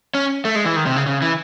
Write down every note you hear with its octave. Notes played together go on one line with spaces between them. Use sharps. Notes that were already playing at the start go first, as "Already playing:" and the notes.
C#4
A3
G#3
E3
D#3
C3
C#3
C#3
E3